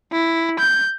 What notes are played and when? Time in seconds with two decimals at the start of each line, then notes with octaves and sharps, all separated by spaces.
0.12 E4
0.60 G6